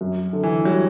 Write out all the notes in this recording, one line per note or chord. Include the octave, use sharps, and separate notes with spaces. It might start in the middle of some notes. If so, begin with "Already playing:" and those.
F#2
D3
E3
F#3 G3